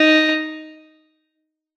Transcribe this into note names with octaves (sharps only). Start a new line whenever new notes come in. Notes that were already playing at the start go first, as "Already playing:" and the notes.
Already playing: D#4